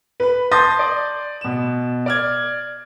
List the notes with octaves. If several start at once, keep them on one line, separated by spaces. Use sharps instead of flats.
B4 B5
A5 C6 D#6 G6 A6 A#6
D5
B2 E7
D5 F6 G#6